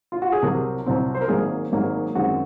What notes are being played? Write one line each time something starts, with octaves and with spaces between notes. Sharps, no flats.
F4
F#4
G#4
C2 C3 F#3 C4 A#4
C2 C3 F#3 C4
C5
A#4
G#1 G#2 F#3 A#3 G#4
G#1 G#2 F#3 A#3
F#2 D#3 G#3 C4 F#4